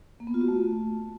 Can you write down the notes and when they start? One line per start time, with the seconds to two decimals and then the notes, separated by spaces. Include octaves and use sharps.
0.20 A#3
0.27 B3
0.34 F4
0.41 F#4
0.48 A3